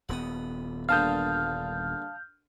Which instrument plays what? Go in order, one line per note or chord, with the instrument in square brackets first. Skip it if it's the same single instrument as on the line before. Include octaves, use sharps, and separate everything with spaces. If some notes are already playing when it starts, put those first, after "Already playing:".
[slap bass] D#1 B3 [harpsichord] F#5 G5 D#6
[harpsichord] G2 D3 A#3 [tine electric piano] F5 A5 D#6 [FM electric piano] F6 G6